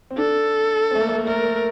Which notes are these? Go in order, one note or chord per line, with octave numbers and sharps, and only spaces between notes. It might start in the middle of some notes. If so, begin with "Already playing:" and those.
C4
D4 A4
C4
A3
A#3
A3
A#3
A3 A#4
A3